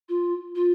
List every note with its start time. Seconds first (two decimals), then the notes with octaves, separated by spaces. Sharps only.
0.09 F4
0.55 F4